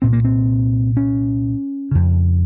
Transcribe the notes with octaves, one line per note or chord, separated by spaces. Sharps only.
C2 A#2 C4
A#3
C4
C#4
F2 C#3